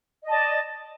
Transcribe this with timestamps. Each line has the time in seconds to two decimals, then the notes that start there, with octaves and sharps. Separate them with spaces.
0.23 D#5
0.27 A5
0.30 D5